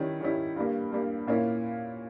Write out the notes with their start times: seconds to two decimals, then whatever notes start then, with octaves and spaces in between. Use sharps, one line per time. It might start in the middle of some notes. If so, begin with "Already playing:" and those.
Already playing: D#3 G3 C#4 E4
0.21 D#3 G3 C#4 E4
0.56 G2 G3 A#3
0.91 G2 G3 A#3
1.27 A#2 A#3 C#4 E4